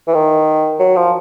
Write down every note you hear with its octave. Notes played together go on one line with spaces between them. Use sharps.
E3
D#3
F#3
F3